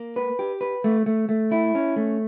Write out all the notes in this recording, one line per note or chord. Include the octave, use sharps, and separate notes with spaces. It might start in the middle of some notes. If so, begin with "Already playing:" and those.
Already playing: A#3
B4
G4
B4
A3
A3
A3
E4
C#4
A3